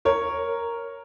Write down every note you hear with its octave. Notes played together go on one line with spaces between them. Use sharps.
A#4 C#5